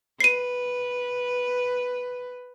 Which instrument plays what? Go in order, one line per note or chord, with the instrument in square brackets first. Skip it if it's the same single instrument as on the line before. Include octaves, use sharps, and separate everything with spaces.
[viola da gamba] B4 [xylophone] C7 D#7